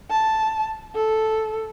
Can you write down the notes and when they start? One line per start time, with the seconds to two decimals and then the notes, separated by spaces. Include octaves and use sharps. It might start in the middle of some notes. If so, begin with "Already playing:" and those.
0.10 A5
0.95 A4